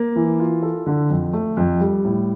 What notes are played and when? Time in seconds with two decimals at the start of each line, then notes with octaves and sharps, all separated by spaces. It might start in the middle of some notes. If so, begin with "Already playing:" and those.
Already playing: A#3
0.16 E3
0.40 F4
0.63 A4
0.86 D3
1.10 F2
1.33 A3
1.57 F2
1.80 G3
2.04 A2